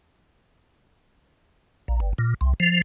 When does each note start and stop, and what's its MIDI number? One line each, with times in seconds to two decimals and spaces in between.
1.88 2.00 34
2.00 2.13 31
2.18 2.34 46
2.41 2.54 36
2.60 2.82 53